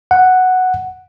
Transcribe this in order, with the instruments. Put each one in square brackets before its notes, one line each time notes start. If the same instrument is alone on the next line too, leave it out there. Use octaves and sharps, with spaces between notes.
[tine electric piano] F#5